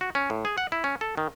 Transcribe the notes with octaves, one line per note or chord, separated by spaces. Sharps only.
F#4
C#4
A2
G#4
F#5
E4
C#4
A4
D#3